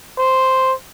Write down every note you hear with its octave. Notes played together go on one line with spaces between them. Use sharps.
C5